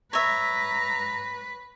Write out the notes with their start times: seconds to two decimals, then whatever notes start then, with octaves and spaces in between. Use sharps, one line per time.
0.13 B4 C#5 E5 A#5